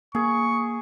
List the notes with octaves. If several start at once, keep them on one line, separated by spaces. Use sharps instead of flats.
A#3 G#4 C#6